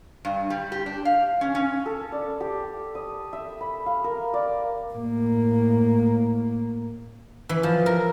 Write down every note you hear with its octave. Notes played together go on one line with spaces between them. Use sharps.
G2
G3
G4
D4
F5
C#4
C#4
A4
D5
G4
D#6
E5
B5
F5
A#4
D5
A2 A#3
E3
F3
A#4